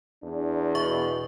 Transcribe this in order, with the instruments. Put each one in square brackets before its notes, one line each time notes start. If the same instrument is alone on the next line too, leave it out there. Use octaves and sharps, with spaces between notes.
[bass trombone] E2 [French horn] D4
[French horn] B2 [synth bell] E5 C#6